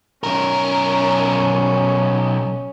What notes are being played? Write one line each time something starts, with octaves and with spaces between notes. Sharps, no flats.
B1 C#4 A#4